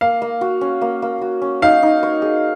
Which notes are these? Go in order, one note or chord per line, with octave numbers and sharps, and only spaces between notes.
A#3 F5
A#3
F#4
C#4
A#3
A#3
F#4
C#4
D#4 F5
D#4
C#5
G#4